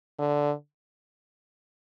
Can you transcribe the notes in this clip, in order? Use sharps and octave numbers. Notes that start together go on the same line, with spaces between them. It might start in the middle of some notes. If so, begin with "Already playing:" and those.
D3